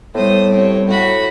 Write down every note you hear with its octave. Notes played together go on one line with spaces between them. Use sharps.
A2 G3 B3 C5 D#6
C4 C#5
A2 F#4 B5